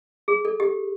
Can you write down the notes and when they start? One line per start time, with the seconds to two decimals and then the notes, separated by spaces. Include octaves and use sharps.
0.28 G#4
0.45 A4
0.60 G4